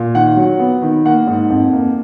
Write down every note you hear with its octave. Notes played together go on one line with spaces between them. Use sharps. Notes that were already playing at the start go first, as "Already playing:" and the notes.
Already playing: A#2
D#3 F#5
F#3
B3
D#3
A#3 F#5
G#2
F2
A#3